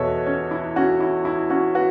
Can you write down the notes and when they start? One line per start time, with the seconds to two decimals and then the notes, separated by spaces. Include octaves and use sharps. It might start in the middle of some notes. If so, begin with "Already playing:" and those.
Already playing: E2 B2 B3 A4 B4 C#5 E5
0.26 C#4
0.51 E4
0.76 C#4 F#4
1.00 E4
1.25 E4
1.50 C#4 F#4
1.75 F#4 B4